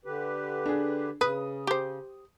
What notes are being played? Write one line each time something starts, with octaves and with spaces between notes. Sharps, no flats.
D3 G4 B4
D4 G#4
C#3 B4 D#6
G4 C5